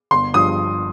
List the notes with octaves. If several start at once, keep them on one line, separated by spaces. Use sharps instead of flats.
G1 C6
G2 F3 D#6